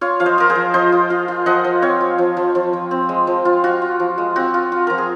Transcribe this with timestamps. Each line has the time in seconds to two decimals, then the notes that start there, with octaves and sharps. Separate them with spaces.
0.01 F4 C#5 F5
0.20 F3 F5
0.26 C5 D#5
0.38 F4 A#4
0.49 G#4 C5
0.55 F3
0.74 F3 C5 D#5
0.92 F4
1.10 F4
1.28 F4
1.46 F3 D#5 F#5
1.64 F3
1.82 C4 C#5 F5
2.00 F4
2.18 F3
2.37 F3
2.55 F3
2.73 F3
2.91 C4
3.09 G#3
3.27 F3
3.45 F4
3.64 F4 F#4
3.82 F4
4.00 F3
4.18 G#3
4.36 C4 F#4
4.54 F4
4.72 F4
4.87 F3 A#4
4.98 G#4